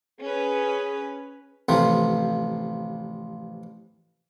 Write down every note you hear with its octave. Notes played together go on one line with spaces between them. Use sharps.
C#4 G#4 B4
A1 C3 F3